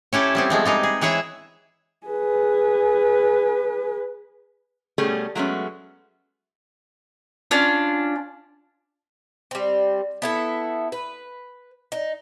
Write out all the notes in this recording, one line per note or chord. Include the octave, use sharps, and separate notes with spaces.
C#4 E4 G4 A4
G3 B3 C4
F3 G#3 A3
G3 G#3 D#4
G#4
E3 E4 G#4 C#5 E5
G#4 B4
B2 G3 A3 C#4 G#4 A4
F#3 G#3 A3 B3 C#4
C#4 D4 F4
G3 C4
B3 E4 A4
B4
D#4